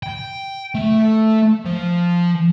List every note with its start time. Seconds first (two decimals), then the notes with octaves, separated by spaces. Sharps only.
0.03 G5
0.75 A3
1.65 F3